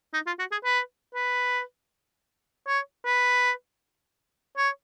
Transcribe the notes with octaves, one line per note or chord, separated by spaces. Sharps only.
D#4
F4
F#4
G#4
B4
B4
C#5
B4
C#5